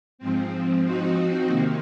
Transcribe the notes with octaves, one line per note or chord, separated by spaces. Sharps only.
G#2 F3 C4
F3 C4 D#4 F#4
C3 D#3 A#3